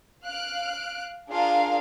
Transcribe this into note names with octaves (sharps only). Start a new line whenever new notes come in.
F5 F6 F#6 D7
D4 F4 G#4 A#4 F5